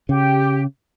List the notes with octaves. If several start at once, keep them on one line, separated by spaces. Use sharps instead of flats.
C#3 G4